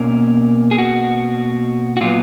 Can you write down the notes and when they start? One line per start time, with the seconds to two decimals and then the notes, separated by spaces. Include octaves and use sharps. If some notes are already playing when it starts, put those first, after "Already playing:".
Already playing: B2 A#3 C#4 A#4
0.71 G#4
0.78 F#4
1.97 F#4
2.01 A#2 F#3 B3 F4